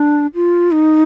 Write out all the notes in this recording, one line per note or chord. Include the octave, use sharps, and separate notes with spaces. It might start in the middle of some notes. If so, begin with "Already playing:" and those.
Already playing: D4
F4
D#4